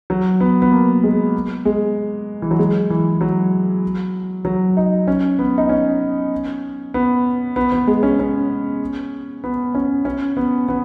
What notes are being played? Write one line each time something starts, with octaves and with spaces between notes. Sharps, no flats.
F#3
B3
B3
A#3
G#3
G#3
E3
F#3
G#3
E3
F#3
F#3
D#4
C#4
B3
D#4
C#4
B3
B3
B3
G#3
C#4
C#4
B3
C#4
C#4
B3
B3